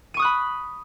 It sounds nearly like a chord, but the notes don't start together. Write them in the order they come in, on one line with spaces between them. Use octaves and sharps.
D#7 C#6 D#6 F#6 B5